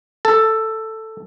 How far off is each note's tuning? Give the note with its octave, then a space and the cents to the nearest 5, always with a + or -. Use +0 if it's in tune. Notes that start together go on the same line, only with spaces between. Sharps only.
A4 +10